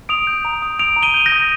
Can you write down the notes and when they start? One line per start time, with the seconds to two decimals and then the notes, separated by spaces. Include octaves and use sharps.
0.09 D#6 D7 F7
0.27 G6
0.45 A#5
0.62 D#6
0.79 D#6 D7 F7
0.96 A#5
1.03 D#7 G7
1.14 G6
1.26 G6 A#6
1.32 D#6